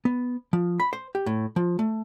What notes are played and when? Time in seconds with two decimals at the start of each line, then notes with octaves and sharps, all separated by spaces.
0.05 B3
0.53 F3
0.80 B5
0.93 C5
1.15 G4
1.26 A2
1.56 F3
1.79 A3